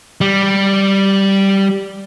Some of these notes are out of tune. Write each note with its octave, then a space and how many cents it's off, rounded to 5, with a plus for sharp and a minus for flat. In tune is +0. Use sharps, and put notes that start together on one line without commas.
G3 -5